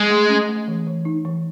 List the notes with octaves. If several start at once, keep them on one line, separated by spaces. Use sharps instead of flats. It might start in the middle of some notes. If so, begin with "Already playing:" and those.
Already playing: G#3
A3
C#4
A3
E3
E3
D#4
E3